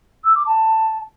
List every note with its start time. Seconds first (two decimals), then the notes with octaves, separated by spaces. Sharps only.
0.24 E6
0.35 D6
0.46 A5